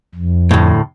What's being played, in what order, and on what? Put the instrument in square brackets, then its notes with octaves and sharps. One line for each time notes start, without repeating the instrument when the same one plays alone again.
[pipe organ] F2
[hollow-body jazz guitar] D2 A2